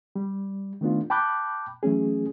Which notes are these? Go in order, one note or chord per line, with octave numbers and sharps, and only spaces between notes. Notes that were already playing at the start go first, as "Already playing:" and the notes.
G3
D#3 A3 B3 D4 F4
G5 A5 B5 D6 F#6 G6
E3 F#3 A3 C#4 G#4